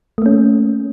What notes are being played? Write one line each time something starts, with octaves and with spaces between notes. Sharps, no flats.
A3 A#3 C#4